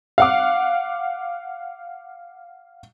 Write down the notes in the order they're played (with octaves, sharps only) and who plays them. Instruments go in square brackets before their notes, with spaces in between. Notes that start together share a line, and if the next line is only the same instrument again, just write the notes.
[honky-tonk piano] F5 F#5 D6